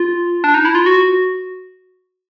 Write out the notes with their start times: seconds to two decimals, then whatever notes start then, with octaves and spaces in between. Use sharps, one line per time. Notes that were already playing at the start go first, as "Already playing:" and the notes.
Already playing: F4
0.44 D4
0.54 D#4
0.65 E4
0.75 F4
0.86 F#4